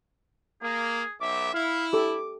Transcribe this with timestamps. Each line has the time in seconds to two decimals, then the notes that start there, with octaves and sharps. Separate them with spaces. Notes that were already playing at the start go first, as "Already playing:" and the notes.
0.62 A#3 G#4
1.21 B1 E5 D6
1.54 E4 F5
1.93 G4 A4 D6